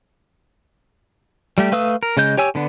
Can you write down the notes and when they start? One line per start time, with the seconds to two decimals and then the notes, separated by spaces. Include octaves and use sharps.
1.58 G3 A3 G4
1.72 A3 B4 F5 D#6 E6
2.03 A#4
2.17 C#3 G#3 D#5 G6
2.37 G4 C#5 G#5 E6
2.55 D3 B3 D4